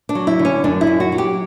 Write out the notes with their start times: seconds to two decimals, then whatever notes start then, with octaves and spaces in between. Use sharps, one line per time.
0.09 D4
0.15 F#3
0.27 E4
0.39 D3
0.45 C#4
0.64 F#2 D4
0.81 E4
0.87 F#2
1.00 F#4
1.12 F#3
1.18 G4